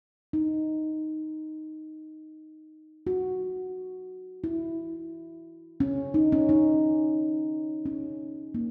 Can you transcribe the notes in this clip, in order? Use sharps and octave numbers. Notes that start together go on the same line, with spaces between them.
D#4
F#4
E4
C#4
D#4
C#4
D#4
C#4
A#3